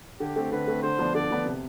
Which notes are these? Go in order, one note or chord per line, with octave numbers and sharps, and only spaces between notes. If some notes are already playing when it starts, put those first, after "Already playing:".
D3 G4
A3 C4
D3 B4
A3 C4
D3 C5
F3 B3 D4
D3 D5
F3 B3 D4
C3